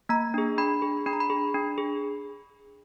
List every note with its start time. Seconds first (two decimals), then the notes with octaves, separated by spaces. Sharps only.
0.09 A#3 A#5
0.34 D4 G#4
0.58 D4 B5
0.82 G#4
1.06 D4 B5
1.13 A#5
1.20 B5
1.30 G#4
1.54 D4
1.78 G#4